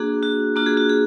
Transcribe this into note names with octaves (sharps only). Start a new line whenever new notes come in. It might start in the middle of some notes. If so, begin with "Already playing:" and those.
Already playing: A#3 D4 F#4 G#4
F#4
A#3 D4 F4 F#4
G#4
F#4
G#4